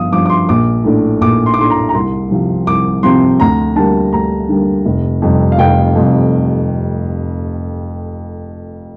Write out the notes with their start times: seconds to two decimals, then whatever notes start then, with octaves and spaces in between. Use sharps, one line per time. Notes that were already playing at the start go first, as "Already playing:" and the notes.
Already playing: G1 G2 F3 F5 D#6
0.12 G2 F3 D6
0.26 D6
0.30 C6
0.49 A#1 D6
0.84 A2 A3 D4
1.21 A#1 D6
1.46 C6
1.54 D6
1.58 A2 A3 D4 C6
1.70 A#5
1.89 A#5
1.94 C2 C6
2.30 C3 F3 C4
2.67 C2 D6
3.03 C3 F3 C4 C6
3.40 D2 A#5
3.76 D3 G3 A#3 A5
4.13 D2 A#5
4.49 D3 G3 A#3
4.85 F1
5.22 F2 C3 G3
5.52 F5
5.58 F1 G5
5.95 F2 C3 G3